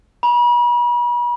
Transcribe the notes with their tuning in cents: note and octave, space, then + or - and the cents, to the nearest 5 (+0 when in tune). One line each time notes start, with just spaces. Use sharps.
B5 -40